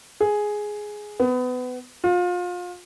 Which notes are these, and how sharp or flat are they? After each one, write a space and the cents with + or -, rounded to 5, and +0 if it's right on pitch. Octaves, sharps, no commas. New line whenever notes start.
G#4 +5
B3 +25
F4 +30